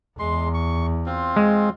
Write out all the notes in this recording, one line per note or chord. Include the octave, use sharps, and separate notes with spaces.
E2 G#3 C6
C#6
C4 F4
G#3